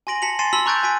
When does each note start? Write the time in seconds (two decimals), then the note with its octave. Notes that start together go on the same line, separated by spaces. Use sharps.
0.07 G#5 C6 A#6 D7 F#7
0.22 A5 B6 C#7 F7 F#7
0.39 G#5 C6 A6 C7 D#7 E7
0.53 A5 B5 C6 E6 B6 F#7
0.66 A#5 C#6 F#6 G6 A6 D7
0.83 G#5 B6 D7